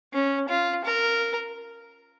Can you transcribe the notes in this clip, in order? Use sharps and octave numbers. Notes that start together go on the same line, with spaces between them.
C#4
F4
A#4